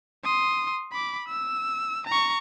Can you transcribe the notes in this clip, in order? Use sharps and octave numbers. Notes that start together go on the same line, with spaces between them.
C6 D#6
B5 D6
E6
A#5 C#6